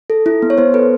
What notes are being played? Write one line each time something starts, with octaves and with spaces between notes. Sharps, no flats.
A4
E4
B3
C#5
B3 C5
A4 B4